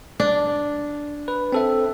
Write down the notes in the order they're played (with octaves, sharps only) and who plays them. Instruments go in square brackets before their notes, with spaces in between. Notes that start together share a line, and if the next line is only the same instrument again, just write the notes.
[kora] D4
[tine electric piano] B4
C4 A4 E5